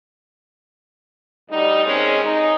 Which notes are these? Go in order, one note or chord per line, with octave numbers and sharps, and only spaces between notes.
D2 G3 D#4
D#3 G#3 C4 C#4
D#4